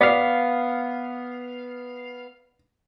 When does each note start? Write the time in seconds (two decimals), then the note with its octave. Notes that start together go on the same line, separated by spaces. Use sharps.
0.01 B3 D5 F5